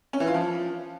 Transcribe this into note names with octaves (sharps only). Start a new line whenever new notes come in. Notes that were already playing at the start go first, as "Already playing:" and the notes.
C#4
E3
F4
F3